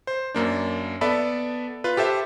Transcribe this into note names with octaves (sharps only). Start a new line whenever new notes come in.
C5
F#2 A#3 D4
B3 A4 D5 E5 A5 B5
F4 B4
G4 A4 C5 E5